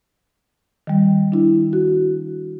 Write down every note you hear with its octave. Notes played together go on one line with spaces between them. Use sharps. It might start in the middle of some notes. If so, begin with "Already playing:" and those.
D#3 G3
D4 E4
F#4